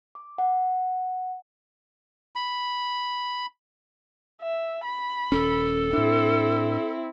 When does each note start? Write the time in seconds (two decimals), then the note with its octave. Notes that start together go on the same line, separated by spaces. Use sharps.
0.15 D6
0.38 F#5
2.36 B5
4.42 E5
4.84 B5
5.32 D#1 C#4 A4
5.93 A2 C4 D4 E4